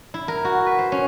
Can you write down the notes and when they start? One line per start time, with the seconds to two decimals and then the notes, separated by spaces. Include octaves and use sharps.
0.14 E4
0.28 A#4
0.45 F#4
0.66 B4
0.79 C5
0.92 C#4